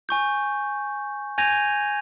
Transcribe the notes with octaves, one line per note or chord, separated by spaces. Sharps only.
G#5 C#6 G6
G#5 G6 G#6 A#6 D#7 F7